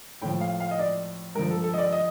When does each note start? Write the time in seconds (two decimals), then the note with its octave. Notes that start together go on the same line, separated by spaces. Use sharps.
0.22 A2 F3 G5
0.41 F5
0.60 F5
0.71 D#5
0.79 D5
1.35 G2 A#4
1.39 F3
1.51 A4
1.64 A4
1.74 D#5
1.78 D5
1.93 D#5